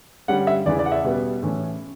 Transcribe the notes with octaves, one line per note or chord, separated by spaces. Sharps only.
G2 D3 G3 C#4 F#5
E5
E2 C#3 E3 D5
D5
F#5
E5
B2 G3 B3
A2 E3 A3 C#4